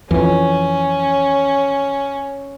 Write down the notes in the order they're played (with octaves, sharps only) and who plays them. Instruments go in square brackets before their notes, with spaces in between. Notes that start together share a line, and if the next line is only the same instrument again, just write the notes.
[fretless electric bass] F2 E3 [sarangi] C#4